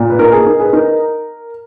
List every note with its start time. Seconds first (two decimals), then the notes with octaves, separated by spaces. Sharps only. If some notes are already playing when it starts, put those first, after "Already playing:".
Already playing: A#2
0.10 B4
0.19 D#4 A#4
0.32 G#4
0.46 D#4 A#4
0.59 G#4 B4
0.73 D#4 A#4